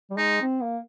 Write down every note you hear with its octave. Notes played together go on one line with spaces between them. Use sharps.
G3
G#3 D#4
C4
A#3